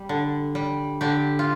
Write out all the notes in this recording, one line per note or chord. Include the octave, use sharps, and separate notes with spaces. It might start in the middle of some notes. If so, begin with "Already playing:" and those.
Already playing: G3
D3
G3
D3 G4
F4